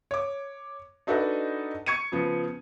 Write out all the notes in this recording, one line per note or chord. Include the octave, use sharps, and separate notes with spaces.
C#5 D6
D4 D#4 F#4 A4 B4 D#5
C#6 G#6 C#7 D#7
C#3 F3 B3